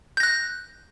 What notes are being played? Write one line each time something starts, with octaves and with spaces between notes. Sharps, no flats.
F#6 G6 A#6